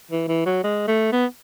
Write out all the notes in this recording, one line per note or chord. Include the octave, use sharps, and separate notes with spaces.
E3
E3
F#3
G#3
A3
B3